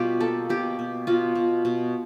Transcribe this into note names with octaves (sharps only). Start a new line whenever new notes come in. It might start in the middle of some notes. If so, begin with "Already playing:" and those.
Already playing: B2 G3 F4 G4
A#3 A4
B2 G4
B2
B2 F4
B2
B2